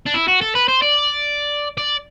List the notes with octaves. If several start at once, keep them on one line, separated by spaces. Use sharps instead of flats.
D4
E4
F#4
A4
B4
C5
D5
D5